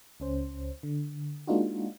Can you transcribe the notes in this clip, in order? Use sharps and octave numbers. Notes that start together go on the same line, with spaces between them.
C#2 C#4 C5
D3
G#3 A#3 D4 D#4 F4 F#4